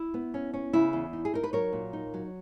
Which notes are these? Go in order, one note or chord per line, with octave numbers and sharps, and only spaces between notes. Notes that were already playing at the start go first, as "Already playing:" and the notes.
Already playing: E4
B3
C#4
C#4
C#3 E4
E2
D#4
G#4
D#4 A#4
B4
F#3 A#4 C#5
A#2
D#4
F#3